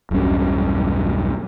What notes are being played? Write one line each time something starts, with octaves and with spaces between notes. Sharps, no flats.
E1 B1 G2 C#4